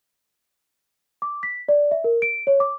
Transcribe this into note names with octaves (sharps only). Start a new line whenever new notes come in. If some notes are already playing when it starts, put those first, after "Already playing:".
D6
B6
D5
E5
A#4
D7
C#5
D6